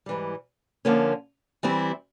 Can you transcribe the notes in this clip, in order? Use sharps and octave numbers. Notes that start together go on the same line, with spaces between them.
G#2 E3 G3
D3 F3 A#3 C#4
E3 G3 C4 E4 G4